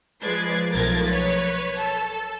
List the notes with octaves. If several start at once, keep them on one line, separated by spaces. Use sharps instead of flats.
F3 G#3 B4 D5 G#6 C7
B1 F3 A3 A#4 G#6 A6
B4 C#5
A4